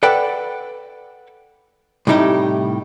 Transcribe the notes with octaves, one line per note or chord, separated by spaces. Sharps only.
A4 B4 D5 F#5 G5
A2 C3 G3 D#4 E4 G4